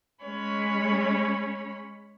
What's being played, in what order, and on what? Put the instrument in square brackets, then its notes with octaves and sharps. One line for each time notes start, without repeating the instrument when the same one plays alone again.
[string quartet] G#3 C#4 C#5 B5